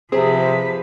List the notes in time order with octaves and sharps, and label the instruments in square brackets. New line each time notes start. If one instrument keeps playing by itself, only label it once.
[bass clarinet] C3 [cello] F3 B4 [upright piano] C4 [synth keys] G#4